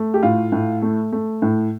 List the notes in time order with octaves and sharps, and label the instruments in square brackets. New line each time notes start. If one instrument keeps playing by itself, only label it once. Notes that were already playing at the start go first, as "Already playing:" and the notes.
Already playing: [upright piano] A3
G4
A2 F4
A2
A3
A3
A2